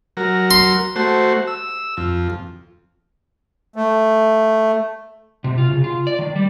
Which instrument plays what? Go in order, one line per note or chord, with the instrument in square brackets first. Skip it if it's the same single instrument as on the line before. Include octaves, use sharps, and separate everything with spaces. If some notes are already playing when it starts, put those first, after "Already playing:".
[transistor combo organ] F#3 A#4
[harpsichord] C6
[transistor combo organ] A3 F#4 C5
E6
F2
[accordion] A3
[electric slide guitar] C3
F4
C#3
F4
D5
D#3
G3